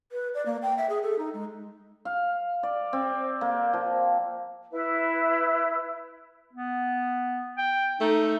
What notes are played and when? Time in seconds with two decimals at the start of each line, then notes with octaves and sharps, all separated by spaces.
0.12 B4
0.34 D5
0.45 A#3
0.62 G5
0.77 E5
0.89 G#4
1.03 A4
1.19 D#4
1.34 G#3
2.05 F5
2.63 D5
2.93 C4
3.41 A#3
3.73 F3
4.72 E4 B4
6.53 B3
7.58 G5
8.01 A3 D#4